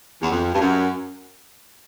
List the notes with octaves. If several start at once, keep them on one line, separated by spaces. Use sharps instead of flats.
E2
F2
G2
F#2